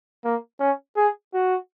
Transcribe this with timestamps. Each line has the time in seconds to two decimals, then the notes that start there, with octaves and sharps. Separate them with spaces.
0.24 A#3
0.60 C#4
0.96 G#4
1.33 F#4